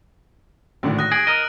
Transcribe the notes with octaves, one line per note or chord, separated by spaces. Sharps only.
G#1 A2 D3
D#6 F#6 A#6
G#4 A#6 D7 F#7
A#4 D#5